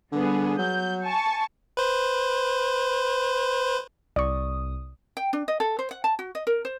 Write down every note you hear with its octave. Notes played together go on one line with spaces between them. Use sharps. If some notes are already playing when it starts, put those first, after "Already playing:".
D3 G3 B3 G#4
F#3 G6
G#5 A5 C#6
B4 C5
C2 D5 C#6 D#6
G5
D4
D#5
A4
C5
F#5
A5
F#4
D#5
A#4
C5